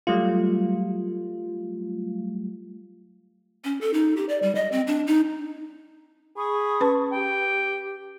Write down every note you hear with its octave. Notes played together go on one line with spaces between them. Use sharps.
F#3 G3 A3 F4
C#4
A4
D#4
G4
D5
G3
D#5
C4
D4
D#4
G#4 B5 C#6 D#6
C#4 B4 A5
G4 G5